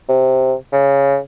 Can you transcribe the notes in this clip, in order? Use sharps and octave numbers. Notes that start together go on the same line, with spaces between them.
C3
C#3